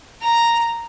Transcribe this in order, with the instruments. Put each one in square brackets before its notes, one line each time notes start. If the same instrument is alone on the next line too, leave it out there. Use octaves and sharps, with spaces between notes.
[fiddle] A#5